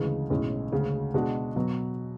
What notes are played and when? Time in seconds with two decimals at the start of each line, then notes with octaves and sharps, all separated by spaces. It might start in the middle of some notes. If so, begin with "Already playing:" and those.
Already playing: D2 C#3 E3 G#3
0.30 B1 A2 G#3 C#4
0.72 D2 C#3 G#3 C#4
1.14 B2 G#3 D4 F#4
1.56 B2 F#3